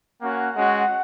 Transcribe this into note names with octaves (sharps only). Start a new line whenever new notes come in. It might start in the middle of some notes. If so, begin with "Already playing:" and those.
A#3 C#4 F#4 F#5
G#3 C#4 F#4